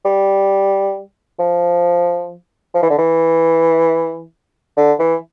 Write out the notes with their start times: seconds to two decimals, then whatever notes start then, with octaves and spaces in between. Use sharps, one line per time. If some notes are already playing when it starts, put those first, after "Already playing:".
0.05 G3
1.39 F3
2.74 F3
2.83 E3
2.90 D3
2.98 E3
4.77 D3
4.99 E3